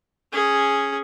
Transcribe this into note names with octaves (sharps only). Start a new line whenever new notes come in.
C#4 G#4